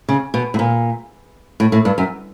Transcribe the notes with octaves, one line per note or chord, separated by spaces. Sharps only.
C#3
B2
A2
A#2
A2
A2
G2
F#2